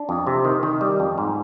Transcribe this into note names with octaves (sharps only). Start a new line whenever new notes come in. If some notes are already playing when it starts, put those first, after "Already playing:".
Already playing: D4
F2
C3
D#3
D#3
G3
F2
G#2